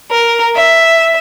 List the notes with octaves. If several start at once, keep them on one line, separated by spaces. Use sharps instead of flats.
A#4
E5